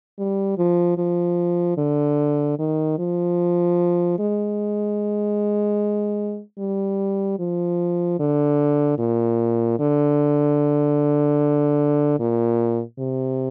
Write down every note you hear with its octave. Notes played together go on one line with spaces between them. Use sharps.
G3
F3
F3
D3
D#3
F3
G#3
G3
F3
D3
A#2
D3
A#2
C3